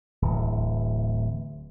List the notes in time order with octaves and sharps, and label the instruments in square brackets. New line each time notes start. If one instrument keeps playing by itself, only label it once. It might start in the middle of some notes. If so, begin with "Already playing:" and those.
[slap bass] D1 E3